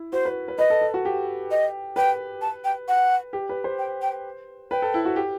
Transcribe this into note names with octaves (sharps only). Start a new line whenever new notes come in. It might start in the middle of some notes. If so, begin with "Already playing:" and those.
Already playing: E4
F#4 C5
B4
B4
B4 D#5
A4
A4
F#4
G4
D#5
B4 G5
A5
G5
F#5
G4
B4
C5
G5
G5
B4 G5
A4
E4
F#4
G4